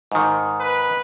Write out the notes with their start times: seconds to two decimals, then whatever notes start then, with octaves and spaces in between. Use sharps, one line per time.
0.12 G#2 D#3
0.60 B4